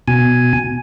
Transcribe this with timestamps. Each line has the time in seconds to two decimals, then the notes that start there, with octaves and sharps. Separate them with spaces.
0.08 B2 G#5